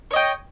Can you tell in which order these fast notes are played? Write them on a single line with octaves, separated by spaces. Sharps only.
C#5 D#5 G5